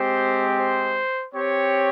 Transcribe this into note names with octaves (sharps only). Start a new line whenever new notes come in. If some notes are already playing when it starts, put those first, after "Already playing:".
Already playing: G#3 C4 G4 C5
C5
C4 G4 C#5